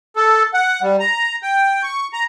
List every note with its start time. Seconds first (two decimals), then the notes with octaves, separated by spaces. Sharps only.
0.16 A4
0.54 F#5
0.82 G3
1.00 A#5
1.43 G5
1.83 C#6
2.13 A#5